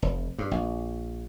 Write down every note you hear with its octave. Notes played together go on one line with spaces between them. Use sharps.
F1
G2
A#1